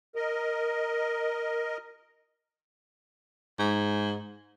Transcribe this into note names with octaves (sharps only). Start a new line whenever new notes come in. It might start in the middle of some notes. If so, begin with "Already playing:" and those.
A#4 D#5
G#2